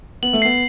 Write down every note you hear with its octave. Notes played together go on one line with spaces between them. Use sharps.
B3 F#7
A3
B3 C7